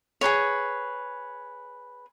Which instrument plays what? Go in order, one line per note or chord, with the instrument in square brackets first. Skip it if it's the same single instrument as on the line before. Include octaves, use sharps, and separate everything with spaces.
[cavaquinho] G#4 A4 B4 C#5